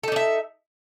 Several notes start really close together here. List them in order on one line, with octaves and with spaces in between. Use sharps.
A4 D#4 D4 E5